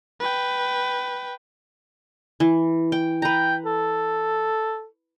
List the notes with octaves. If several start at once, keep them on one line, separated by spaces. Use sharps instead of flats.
B4 G5
E3
G5
B4 G5 A#5
A4